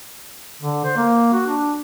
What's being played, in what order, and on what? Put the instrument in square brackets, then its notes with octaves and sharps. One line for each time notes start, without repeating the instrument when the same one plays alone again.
[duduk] D3
C5
A#3
F#4
D4